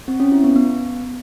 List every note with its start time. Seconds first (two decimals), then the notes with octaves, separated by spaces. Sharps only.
0.08 C4
0.20 C#4
0.32 E4
0.44 B3
0.56 B3